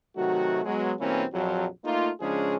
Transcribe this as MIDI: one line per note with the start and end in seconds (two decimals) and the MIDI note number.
0.16 0.61 48
0.16 0.61 51
0.16 0.61 54
0.16 0.61 57
0.16 0.61 66
0.65 0.93 54
0.65 0.93 56
0.65 0.93 59
1.00 1.25 43
1.00 1.25 47
1.00 1.25 52
1.00 1.25 58
1.00 1.25 60
1.00 1.25 61
1.34 1.66 34
1.34 1.66 41
1.34 1.66 54
1.85 2.09 57
1.85 2.09 58
1.85 2.09 63
1.85 2.09 65
2.21 2.56 49
2.21 2.56 53
2.21 2.56 56
2.21 2.56 61
2.21 2.56 62
2.21 2.56 68